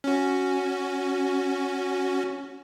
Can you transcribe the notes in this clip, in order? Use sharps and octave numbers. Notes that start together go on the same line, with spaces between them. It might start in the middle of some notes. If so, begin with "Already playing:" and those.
C#4 F#4